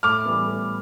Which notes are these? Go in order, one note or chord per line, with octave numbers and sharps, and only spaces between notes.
A2 D6 F6
E3 G3 B3
A2